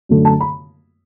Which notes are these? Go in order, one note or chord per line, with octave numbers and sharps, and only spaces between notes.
F#2 D3 A3
A5
B5